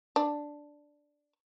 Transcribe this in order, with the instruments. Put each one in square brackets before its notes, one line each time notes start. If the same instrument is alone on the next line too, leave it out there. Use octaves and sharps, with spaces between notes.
[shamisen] D4